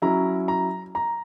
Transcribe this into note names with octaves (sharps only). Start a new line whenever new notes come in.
F#3 C#4 E4 A#5
A#5
A#5